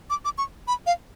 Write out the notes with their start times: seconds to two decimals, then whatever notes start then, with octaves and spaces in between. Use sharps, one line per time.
0.10 D6
0.25 D6
0.38 C#6
0.68 B5
0.86 F5